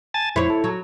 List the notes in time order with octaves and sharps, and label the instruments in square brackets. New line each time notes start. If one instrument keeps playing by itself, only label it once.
[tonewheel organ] G#5 A5 A6
[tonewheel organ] F2 C5 [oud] E4 C#5
[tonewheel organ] A4
[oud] F#3